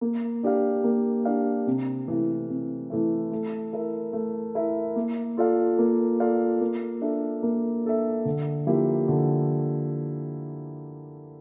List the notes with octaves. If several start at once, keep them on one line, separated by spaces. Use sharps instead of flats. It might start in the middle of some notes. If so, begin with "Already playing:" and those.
A#3
D4 G4 D5 F5
A#3
D4 G4 D5 F5
C3
E3 A3 E4
C3
E3 A3 E4
A3
E4 A#4 E5
A3
E4 A#4 E5
A#3
F4 A4 D5 F5
A#3
F4 A4 D5 F5
A#3
D4 A4 E5
A#3
D4 A4 E5
D3
F3 A#3 E4 G4
D3